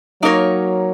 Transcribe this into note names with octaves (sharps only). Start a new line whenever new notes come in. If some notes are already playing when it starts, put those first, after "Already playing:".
F#3 A#3 D#4 A#4 C#5